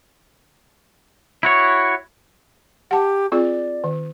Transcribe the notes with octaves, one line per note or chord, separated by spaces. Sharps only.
E4 F#4 C#5
G4 F#5 A5
C4 F4 G#4 D5
D#3